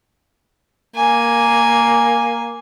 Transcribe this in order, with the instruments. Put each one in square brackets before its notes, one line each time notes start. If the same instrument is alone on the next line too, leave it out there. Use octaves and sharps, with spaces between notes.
[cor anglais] A#3 [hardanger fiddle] G#5